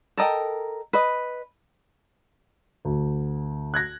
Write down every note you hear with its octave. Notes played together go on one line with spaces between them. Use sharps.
A4 A#4 D#5 G5
B4 D#5
D2
F#6 G#6 A#6